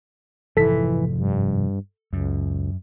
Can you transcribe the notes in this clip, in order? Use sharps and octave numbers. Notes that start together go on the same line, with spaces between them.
F1 G#2 E3 F3 A4 B6
G2
C#2 F#2